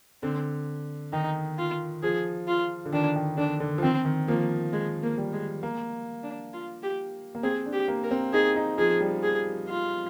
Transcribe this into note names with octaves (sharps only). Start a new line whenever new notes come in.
D3 C4
D#3 D#4
F4
F3 G#4
F4
D3
D#3 D4
D#3
D3 D4
D3
F3
D#3 C4
D#3
F3 A#3
G#3
A#3
G3
G#3
A#3
D4
F4
G4
A#3
C4 G#4
D4
G4
A#3
A#4
C4
D#4 G#4
D#4
F3 G#4
G3
G#4
F4